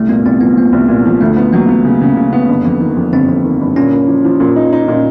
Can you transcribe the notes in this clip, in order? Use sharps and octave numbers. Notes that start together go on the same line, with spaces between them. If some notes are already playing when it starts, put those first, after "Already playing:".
Already playing: C2 A3
A#2 B3
C2 C4
F3 B3
F3 A#3
C2
A#2
F3
D2 A3
B3
F#3 A#3
B3
C#3
C#3
C#3
B3
G1
F2
D#3
F2
G1 C4
F2
D#3
G1
A#2 C#4
A#3
F3
F3
A#2
D#4
D#4
A#2